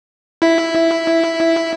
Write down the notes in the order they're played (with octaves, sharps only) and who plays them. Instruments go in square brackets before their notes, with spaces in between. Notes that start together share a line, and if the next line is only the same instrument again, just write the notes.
[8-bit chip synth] E4 E5